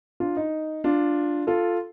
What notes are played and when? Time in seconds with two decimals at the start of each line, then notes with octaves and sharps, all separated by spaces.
0.20 D4 F4
0.37 D#4
0.84 D4 F4
1.47 F4 A4